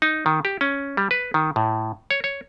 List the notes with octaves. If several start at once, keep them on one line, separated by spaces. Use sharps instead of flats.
D#4
D#3
G4
C#4
G3
B4
D#3
A2
C#5
C#5